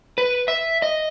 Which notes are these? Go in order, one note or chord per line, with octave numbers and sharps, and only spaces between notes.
B4
E5
D#5